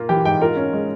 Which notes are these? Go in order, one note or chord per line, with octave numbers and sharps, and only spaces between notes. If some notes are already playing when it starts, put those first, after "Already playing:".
Already playing: A#2 A#3 F4
E3 G4 G5
G#2 G4 G5
F4 A#4
C#4
G#3